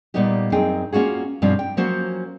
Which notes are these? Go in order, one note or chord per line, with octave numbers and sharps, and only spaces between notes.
A#2 G3 A#3 B3 D#4 G4
F#2 C4 D#4 G#4 G5
A#3 C#4 F4 F#4 G#4
G2 B2 F3 G3 C4 C#4
G5
F3 F#3 A#3 C#4 F#4 C5